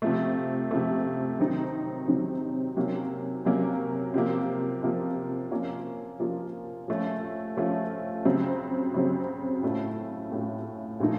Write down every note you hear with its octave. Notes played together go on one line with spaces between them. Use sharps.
C3 F3 A3
C3 F3 A3
C3 D#3 F#3 C4 D#4
C3 D#3 F#3 C4 D#4
C3 F#3 A#3 C#4
C3 F#3 A#3 C#4
C3 F3 A#3
C3 F3 A#3
F3 A#3 C#4 F4
F3 A#3 C#4 F4
F3 A3 C#4 F4
F3 A3 C#4 F4
C#3 F#3 C4
C#3 F#3 C4
A2 A3 C#4 F4
A2 A3 C#4 F4
A#2 F3 A3 D#4